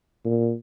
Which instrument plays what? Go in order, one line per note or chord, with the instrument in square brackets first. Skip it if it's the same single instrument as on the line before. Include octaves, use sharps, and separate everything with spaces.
[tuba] A#2